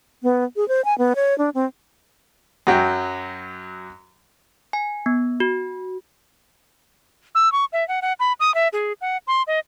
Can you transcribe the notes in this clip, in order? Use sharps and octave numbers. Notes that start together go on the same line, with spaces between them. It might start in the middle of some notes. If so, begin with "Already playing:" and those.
B3
G#4
C5
G#5
B3
C#5
D4
C4
F#2 F#3 G5
G#5
B3
F#4
E6
C#6
E5
F#5
F#5
B5
D#6
E5
G#4
F#5
C6
D#5